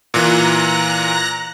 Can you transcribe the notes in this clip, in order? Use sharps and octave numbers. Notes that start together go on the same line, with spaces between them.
A#2 E3 A#5 F#6 A#6